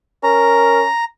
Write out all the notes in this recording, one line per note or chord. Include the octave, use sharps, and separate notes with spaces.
C#4 A#4 A#5